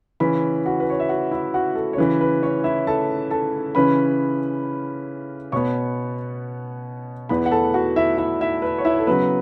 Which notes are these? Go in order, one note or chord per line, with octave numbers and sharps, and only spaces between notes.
C#3 E3 C#4 B4 B5
F#4 F#5
B4
C#5
E5
F#4 F#5
E4 E5
F#4 F#5
A4
C#5
C#3 E3 C#4 B4
B4
C#4 C#5
E4 E5
A4 A5
A4 A5
C#3 E3 C#4 B4 B5
B2 B3 C#5 C#6
E2 E3 B3 B4 B5
F#5
A4 A5
F#4 F#5
E4 E5
E4 E5
E4 E5
B4
C#5
E4 E5
A4
C#3 F#3 B3 B4